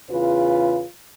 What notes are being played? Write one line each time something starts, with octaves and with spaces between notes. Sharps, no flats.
E2 C#3 F4 B4